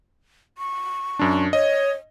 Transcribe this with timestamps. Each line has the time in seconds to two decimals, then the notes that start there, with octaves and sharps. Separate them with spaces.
0.58 C#6
1.19 F#2 D4
1.53 C#5 D#5